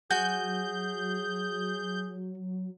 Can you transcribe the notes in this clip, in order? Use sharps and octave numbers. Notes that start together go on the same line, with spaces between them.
F#3 F#4 G#4 G#5 G6